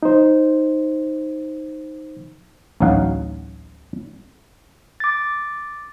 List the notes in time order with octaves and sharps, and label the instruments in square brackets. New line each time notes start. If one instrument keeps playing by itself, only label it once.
[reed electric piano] D#4 C5
[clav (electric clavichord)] A1 D2 F#3 D#4 F5 F#5
[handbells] D6 A6